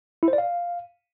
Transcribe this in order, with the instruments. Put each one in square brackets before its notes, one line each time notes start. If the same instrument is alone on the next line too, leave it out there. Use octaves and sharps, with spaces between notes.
[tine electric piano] E4
C5
D5
F5